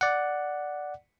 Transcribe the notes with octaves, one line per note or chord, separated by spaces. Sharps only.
D5 F#5